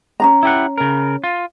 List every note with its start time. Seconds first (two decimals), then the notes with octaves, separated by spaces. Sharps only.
0.20 C#4 D4 A#5
0.43 E4 G4 F#5
0.78 C#3 A#4
1.24 F4